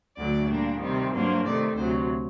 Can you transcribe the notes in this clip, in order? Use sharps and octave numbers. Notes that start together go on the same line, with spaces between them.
D2 D3 F#3 A3 D5
A#2 G3 A#3 D4
C3 D#3 G3 C4
G2 F#3 A#3 D4 C5
C3 D#3 A3 C4 D5
D2 C3 F#3 C5